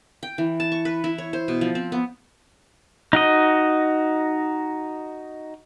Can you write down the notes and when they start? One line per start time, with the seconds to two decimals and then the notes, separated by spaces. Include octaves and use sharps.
0.23 G5
0.38 E3
0.60 A5
0.72 C#6
0.85 B4
1.04 E4
1.18 C#5
1.33 C5
1.48 B2
1.61 F3
1.75 C4
1.92 B3
3.13 D#4 F#4 D#5